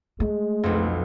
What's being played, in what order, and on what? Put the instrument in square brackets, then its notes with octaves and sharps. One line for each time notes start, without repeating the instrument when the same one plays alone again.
[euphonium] G#3 [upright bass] A3
[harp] B1 F2